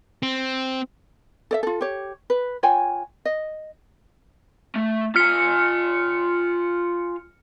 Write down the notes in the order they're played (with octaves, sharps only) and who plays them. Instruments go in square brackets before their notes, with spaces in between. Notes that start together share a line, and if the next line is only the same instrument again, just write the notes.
[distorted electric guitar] C4
[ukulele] A4 D5 E5
F4 A4
G4 C#5
B4
F4 C#5 G5 G#5
D#5
[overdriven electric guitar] A3
[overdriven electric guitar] F4 G#5 [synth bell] F6 C#7